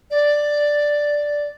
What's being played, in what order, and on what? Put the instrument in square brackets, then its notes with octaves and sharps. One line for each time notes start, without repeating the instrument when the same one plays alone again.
[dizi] D5